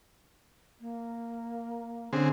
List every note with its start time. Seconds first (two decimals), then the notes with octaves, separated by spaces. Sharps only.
0.81 A#3
2.13 D3 C4 C#4 G#4